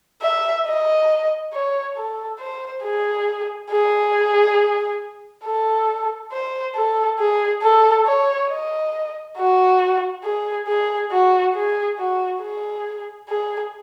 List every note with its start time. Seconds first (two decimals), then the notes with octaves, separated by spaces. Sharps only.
0.22 E5
0.65 D#5
1.53 C#5
1.96 A4
2.40 C5
2.83 G#4
3.70 G#4
5.45 A4
6.32 C5
6.75 A4
7.19 G#4
7.63 A4
8.06 C#5
8.49 D#5
9.37 F#4
10.24 G#4
10.67 G#4
11.11 F#4
11.55 G#4
11.98 F#4
12.42 G#4
13.29 G#4